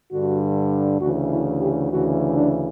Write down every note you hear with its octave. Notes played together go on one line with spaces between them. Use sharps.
G2 D3 F#4
D2 C#3 E3 F#4
E4
G4
D2 C#3 E3 F#4
D4